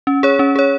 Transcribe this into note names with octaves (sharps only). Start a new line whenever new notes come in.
C#4
G#4 C#5
C#4
G#4 C#5